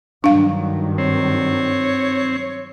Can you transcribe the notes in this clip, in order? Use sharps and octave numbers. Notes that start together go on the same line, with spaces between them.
G2 D#3 F#3 D4 F5
C4 C#5